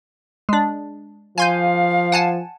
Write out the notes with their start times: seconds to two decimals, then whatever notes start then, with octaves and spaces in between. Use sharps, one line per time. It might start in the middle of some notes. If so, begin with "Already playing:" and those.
0.49 G#3 D4
1.38 F3 F5 G#5 C6 G6
2.12 F#5 G#5 A5